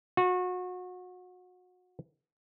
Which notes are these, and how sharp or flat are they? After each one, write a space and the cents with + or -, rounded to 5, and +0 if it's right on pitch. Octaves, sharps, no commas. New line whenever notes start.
F#4 -30